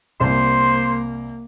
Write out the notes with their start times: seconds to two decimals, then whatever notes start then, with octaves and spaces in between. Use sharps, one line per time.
0.21 C2 A#3 C5 C6